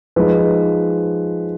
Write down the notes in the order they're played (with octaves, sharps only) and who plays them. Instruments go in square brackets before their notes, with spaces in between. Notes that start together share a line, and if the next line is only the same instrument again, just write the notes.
[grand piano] F3 G#3 D#4 B4